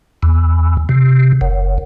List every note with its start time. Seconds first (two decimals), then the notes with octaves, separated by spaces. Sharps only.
0.23 E2
0.89 C3
1.41 F#1